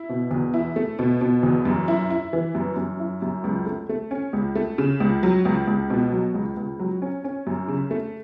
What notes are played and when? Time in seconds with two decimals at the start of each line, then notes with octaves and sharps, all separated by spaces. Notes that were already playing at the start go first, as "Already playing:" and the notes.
Already playing: E4
0.09 B2
0.31 E2
0.54 E4
0.76 A3
0.99 B2
1.21 B2
1.43 E2
1.65 F#2
1.88 E4
2.10 E4
2.33 E3
2.55 F#2
2.76 F#2
3.00 E4
3.22 F#2
3.44 C#2
3.66 A3
3.89 A3
4.11 C#4
4.33 C#2
4.55 A3
4.78 C#3
5.00 C#2
5.23 F#3
5.45 C#2
5.67 C#2
5.90 B2
6.12 F#3
6.34 C#2
6.57 C#2
6.79 F#3
7.02 C#4
7.24 C#4
7.47 F#2
7.68 C#3
7.91 A3